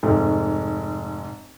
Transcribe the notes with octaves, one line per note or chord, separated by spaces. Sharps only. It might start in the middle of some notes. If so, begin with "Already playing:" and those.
F1 G#2